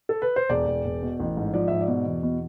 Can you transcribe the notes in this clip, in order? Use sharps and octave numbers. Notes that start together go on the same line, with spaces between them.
A4
B4
C5
E1 D5
E1
E1
B2
A1
G#2
F3 D5
G#2 E5
D5
B2
E2
B2